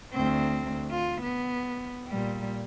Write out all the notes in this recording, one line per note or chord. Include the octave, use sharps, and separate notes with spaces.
D2 C4
F4
B3
A#2 G3